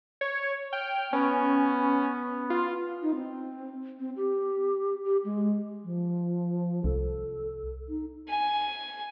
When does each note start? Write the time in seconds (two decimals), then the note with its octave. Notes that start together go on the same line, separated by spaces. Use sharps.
0.21 C#5
0.73 G5 F6
1.13 B3 C#4
2.50 F4
3.02 D#4
3.15 C4
3.99 C4
4.17 G4
5.05 G4
5.25 G#3
5.85 F3
6.84 C2 A4
7.89 D#4
8.29 G#5